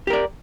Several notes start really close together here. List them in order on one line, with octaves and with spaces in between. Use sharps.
G4 A#4 D5